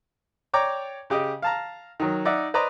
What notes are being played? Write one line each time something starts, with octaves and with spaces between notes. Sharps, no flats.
C#5 D5 G5 A#5 D6
C#3 G4 D#5
F5 A5 A#5
D#3 F#3
D#4 D5 E5 F#5
B4 C5 D5 D#5 A#5